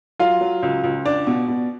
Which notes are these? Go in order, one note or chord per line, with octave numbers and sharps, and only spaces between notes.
F#3 F4 F5
F#3
C#2
C#2
D4 D5
B2
B2